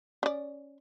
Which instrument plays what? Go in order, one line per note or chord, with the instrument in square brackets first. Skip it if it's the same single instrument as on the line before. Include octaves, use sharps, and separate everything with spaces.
[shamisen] C#4 D5